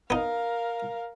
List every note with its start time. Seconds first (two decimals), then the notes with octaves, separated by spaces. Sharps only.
0.10 B3 D#4 A#4 F5